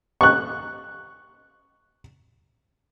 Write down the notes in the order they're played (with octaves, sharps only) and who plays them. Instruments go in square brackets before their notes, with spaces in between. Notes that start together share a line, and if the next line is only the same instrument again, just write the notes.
[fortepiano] C#6 F#6